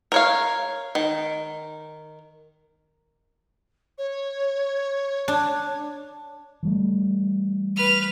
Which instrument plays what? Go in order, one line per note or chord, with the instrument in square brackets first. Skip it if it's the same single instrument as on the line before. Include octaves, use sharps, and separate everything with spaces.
[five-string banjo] A#4 C#5 F5
D#3
[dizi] C#5
[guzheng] D4
[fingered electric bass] E3 G3 A3
[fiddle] B4 F6